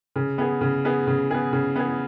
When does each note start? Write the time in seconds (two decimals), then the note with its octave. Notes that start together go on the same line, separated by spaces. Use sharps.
0.16 C#3
0.38 B3 G#4
0.61 C#3
0.85 B3 G#4
1.07 C#3
1.31 B3 G#4
1.53 C#3
1.76 B3 G#4